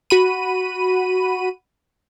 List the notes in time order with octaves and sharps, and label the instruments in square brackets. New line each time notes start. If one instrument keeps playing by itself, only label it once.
[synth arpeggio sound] F#4 B5 D#7